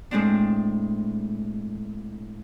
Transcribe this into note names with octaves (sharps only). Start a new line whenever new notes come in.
A2 G#3 C4 D4